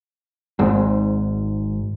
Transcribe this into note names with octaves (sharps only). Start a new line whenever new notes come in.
G#1 G#2